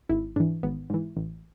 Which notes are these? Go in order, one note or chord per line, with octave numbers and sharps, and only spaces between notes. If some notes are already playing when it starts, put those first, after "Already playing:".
G#1 E4
G#2 E3 D4
G#1 B3
G#2 E3
A1